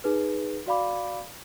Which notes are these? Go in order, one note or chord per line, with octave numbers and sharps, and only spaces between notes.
D#4 G#4 B4
F#4 D5 F5 B5 D6